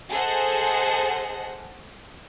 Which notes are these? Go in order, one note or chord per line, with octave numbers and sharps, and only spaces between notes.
G#4 A4 C5 D#5 F#5